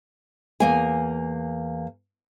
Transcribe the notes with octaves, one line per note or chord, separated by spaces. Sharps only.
E2 A#3 G#5